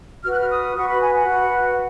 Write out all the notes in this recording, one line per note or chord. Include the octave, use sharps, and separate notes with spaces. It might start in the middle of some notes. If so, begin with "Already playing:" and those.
F#4 B4 F6
F#6
F6
D#6
F#4 B4 C#6
B5
G#5
F#5
F#4 B4